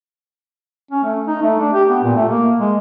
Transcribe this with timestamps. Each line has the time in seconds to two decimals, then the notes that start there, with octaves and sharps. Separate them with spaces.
0.91 C#4
1.03 A3
1.27 D#4
1.42 A3
1.59 D4
1.73 G4
1.89 B3
2.04 A#2
2.16 A3
2.29 A#3
2.60 G#3